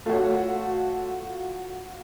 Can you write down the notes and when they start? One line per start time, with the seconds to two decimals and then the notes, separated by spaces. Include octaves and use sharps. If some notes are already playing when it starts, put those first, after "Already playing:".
0.06 A3 F4 F#4 C#5